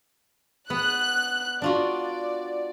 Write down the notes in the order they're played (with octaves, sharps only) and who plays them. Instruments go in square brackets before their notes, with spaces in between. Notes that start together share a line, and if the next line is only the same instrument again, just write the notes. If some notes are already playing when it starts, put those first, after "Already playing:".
[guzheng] B3 [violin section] F#6
[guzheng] D4 F4 F#4 [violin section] D5